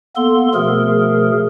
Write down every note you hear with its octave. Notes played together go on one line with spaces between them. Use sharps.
A#3 B3 A4 C6
B2 F3 A3 G#4 A#4